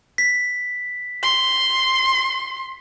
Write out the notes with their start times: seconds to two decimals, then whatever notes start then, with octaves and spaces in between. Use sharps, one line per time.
0.18 B6
1.23 C6